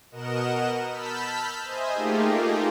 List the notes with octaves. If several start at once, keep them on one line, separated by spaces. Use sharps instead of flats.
B2 A#4 D#5 F#5 E7
A5 B5 E6 F6 G6 B6
C5 D#5 E5 G#5
A3 A#3 D#4 F4 G4 G#4